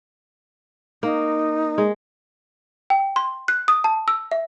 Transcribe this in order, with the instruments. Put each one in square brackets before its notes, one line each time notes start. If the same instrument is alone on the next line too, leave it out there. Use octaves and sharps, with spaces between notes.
[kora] A#3 [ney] D#4
[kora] G#3
[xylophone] G5
C6
F#6
D#6
A5
E6
E5